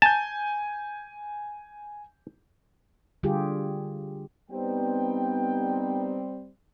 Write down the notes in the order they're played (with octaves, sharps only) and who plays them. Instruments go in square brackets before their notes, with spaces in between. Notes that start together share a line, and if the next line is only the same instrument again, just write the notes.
[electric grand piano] G#5 G6 [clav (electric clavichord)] A5
[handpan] D3 G3 F4 G4 G#4
[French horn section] G3 C4 [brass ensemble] B3 D#4 G5